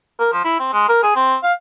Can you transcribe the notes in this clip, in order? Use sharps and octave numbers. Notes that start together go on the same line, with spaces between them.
A#4
F3
E4
C4
G#3
A#4
G#4
C4
F5